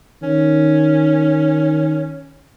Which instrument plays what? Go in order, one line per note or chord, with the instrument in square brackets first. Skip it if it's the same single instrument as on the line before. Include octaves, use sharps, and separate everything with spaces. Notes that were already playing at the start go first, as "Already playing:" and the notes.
[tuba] D#3 [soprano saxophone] C#4